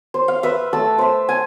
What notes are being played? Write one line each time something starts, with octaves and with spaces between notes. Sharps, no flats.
C5
F5
B4 E5
A3 A5 E6
C5 E5
G#5